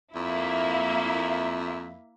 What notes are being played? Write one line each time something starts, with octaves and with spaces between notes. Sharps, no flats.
F2 A#3 E4 E5